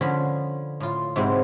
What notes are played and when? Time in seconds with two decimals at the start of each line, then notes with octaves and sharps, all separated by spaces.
0.01 D3 F3 C#4 B5
0.80 A2 F4
1.16 G#2 C3 F#3 C4 E4 G4